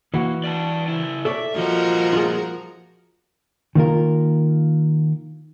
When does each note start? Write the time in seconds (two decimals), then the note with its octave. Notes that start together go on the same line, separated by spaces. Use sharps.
0.14 E3 A#3 F#4
0.44 D5 G5 A5
0.88 C#3 E4
1.25 A4 C#5 D5 E5
1.54 G2 A#2 F3 F#4 A#4 D#5
2.13 F4 G#4
3.75 D#3 A#3 F4 A#4